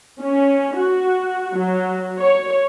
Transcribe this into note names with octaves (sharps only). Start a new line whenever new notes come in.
C#4
F#4
F#3
C#5